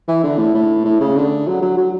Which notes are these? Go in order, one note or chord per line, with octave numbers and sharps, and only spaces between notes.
E3
D3
A2
A2
A2
C#3
D3
F#3
F#3
F#3